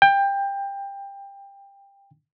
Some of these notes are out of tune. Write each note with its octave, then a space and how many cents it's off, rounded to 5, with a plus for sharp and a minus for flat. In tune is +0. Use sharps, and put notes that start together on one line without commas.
G5 +20